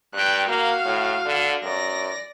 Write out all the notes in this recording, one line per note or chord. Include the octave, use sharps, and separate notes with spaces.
G2 G5 F#6
A#3 F#4 F5
A2
D3
F#2 D5 A#6